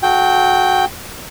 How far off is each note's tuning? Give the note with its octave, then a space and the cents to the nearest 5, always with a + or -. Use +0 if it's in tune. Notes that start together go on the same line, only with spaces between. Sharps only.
F#4 -10 A4 -40 G5 +0